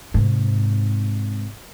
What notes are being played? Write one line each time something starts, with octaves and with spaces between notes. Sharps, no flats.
G#2 C3